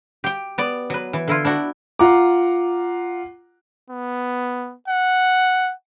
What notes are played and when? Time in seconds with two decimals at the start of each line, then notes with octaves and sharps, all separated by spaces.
0.24 G4 G5
0.58 B3 D5
0.90 F#3 B4
1.13 E3
1.28 D3 E4 F4
1.45 D4 E4 F#4
1.99 F4 F#5 A#5 D6
3.90 B3
4.88 F#5